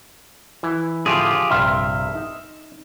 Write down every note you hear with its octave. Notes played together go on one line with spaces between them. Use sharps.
E3 E4 E5
A2 D3 F3 F4 G4 G#4
A#1 G2 C3 E5 C6 F6
D#4